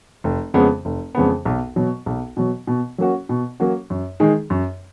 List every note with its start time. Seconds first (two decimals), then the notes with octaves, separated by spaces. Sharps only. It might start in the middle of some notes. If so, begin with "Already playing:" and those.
0.24 F1
0.54 F2 C#3 G#3 B3
0.85 F1
1.15 F2 C#3 G#3 B3
1.45 B1
1.76 B2 F#3
2.06 B1
2.37 B2 F#3
2.67 B2
2.98 F#3 A#3 C#4 F#4
3.29 B2
3.60 F#3 A#3 C#4 F#4
3.90 F#2
4.20 D#3 G#3 D#4 G#4
4.50 F#2